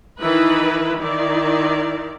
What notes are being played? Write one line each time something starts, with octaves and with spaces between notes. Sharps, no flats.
D#3 E3 D#4 E4 B4 B5
D#3 E4 D5